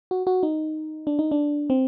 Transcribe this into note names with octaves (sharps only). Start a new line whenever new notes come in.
F#4
F#4
D#4
D4
D#4
D4
C4